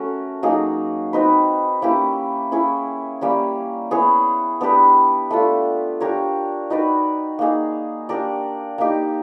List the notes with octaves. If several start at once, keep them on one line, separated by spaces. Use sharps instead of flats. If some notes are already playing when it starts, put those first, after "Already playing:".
Already playing: A3 C#4 F#4 A#4
F#3 A#3 D#4 G#4
C4 D#4 F#4 B4
A#3 C#4 E4 G4
C#4 E4 G#4 C#5
G3 A#3 C#4
B3 E4 G#4 C#5
B3 D4 G4 B4
A3 D4 F4
D4 G4 A#4 C#5
D#4 F#4 B4 D5
A#3 D#4 G#4
D4 G4 A#4 D5
A#3 D#4 G4